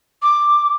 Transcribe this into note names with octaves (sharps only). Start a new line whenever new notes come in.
D6